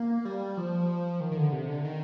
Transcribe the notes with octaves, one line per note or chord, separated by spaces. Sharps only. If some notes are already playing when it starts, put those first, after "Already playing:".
Already playing: A#3
G3
F3
D#3
D#3
D3
C3
D3
D#3